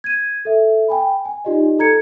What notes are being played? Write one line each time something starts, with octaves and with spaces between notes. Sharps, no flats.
G#6 D#7
A4 E5
G5 G#5 B5
G#5
D#4 F4 G4 D5 D#5
A4 A#5 G#6 C#7